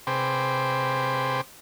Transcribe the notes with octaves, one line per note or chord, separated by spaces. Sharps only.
C3 G#4 B4 C5 G5 D6